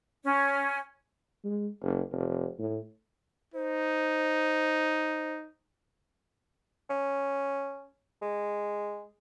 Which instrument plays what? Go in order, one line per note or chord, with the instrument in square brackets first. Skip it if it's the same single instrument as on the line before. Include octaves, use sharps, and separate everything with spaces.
[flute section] C#4
[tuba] G#3
F#1
F1
A2
[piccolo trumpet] D#4 [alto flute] C5
[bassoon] C#4
G#3